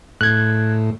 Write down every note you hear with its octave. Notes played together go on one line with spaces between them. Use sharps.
A2 F#6 G#6